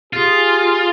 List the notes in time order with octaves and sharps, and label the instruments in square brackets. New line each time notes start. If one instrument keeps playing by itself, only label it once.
[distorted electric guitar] F4 [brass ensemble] G4 G#4